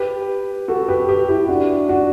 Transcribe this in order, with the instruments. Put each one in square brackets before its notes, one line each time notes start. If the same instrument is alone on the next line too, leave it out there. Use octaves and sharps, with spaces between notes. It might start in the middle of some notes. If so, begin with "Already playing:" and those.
Already playing: [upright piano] G4 B4
F#4 A4
G4 B4
G4 B4
E4 G4
D4 F#4
D4 F#4